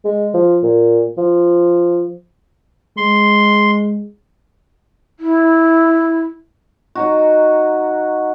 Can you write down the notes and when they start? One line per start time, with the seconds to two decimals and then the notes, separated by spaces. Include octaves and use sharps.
0.04 G#3
0.34 F3
0.63 A#2
1.17 F3
2.97 G#3 C6
5.19 E4
6.95 F#3 D#4 F#4